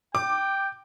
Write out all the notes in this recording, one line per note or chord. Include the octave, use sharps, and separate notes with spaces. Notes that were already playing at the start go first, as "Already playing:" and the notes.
G5 D6